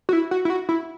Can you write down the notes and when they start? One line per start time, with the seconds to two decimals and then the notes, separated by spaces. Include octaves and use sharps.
0.09 F#4
0.13 E4
0.31 F#4
0.45 E4
0.50 F#4
0.69 E4